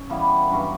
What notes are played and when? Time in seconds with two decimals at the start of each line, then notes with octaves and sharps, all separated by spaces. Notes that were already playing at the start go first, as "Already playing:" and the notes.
Already playing: C#4
0.10 C#3 E3 G3 B3
0.51 G2 F#3 C#4 F#4